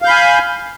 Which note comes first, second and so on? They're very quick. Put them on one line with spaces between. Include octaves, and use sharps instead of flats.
F5 G6 B5 G#5